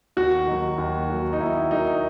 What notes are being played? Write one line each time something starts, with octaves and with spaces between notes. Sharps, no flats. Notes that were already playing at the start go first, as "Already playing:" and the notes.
D#2 F#4
D#3 F#3
D#2
D#3 F#3
D#4
D#2 E4
D#3 F#3 D#4